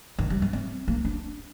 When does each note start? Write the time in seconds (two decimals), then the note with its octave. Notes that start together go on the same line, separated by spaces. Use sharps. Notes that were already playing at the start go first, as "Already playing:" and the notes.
0.18 D#3
0.30 G3
0.42 G#3
0.53 C4
0.88 A#3
1.05 D4